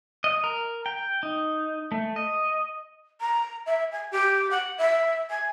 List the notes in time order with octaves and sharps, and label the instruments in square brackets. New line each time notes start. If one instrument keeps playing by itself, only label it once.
[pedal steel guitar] D#5
A#4
G5
D#4
A3
D#5
[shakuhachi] A#5
E5
G#5
G4
F#5
E5
G#5